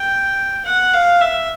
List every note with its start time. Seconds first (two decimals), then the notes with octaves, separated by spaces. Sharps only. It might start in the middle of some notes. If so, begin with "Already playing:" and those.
Already playing: G5
0.65 F#5
0.93 F5
1.21 E5